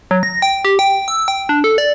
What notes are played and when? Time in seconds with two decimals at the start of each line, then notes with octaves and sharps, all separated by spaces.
0.11 F#3
0.23 A#6
0.42 G5
0.65 G4
0.79 G5
1.08 E6
1.28 G5
1.49 D4
1.64 A4
1.78 D5